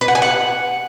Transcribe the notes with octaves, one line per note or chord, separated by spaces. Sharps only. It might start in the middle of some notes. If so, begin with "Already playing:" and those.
B4
F#5
G#5
F#5